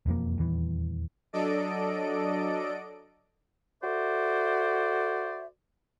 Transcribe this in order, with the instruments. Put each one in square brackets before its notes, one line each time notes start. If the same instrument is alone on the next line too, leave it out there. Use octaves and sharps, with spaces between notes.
[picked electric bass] E1 F2 F3 A#3
D#1 E2 E3
[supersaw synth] F#3 D4 A4 D5 D#5 D7
[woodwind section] F#4 A4 C5 D5 E5